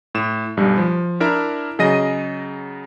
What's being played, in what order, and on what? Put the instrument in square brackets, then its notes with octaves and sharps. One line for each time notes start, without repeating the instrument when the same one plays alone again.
[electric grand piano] A2 E7
B1 G2 G3
F3
D4 E4 A#4 E5 A#5
C#3 F#3 G#4 D#5 A#6 D#7